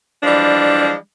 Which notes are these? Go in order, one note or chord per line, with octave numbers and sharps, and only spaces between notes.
E3 F3 G3 G#3 D4